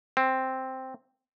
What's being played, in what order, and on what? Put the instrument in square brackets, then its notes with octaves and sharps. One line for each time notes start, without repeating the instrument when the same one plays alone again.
[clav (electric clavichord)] C4